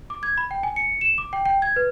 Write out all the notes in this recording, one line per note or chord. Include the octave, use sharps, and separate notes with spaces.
D6
G#6
B5
G5
G#5
C#7
E7
D6
G5
G5
G#6
B4